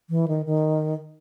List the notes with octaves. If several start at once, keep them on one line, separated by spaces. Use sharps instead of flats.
E3
D#3
D#3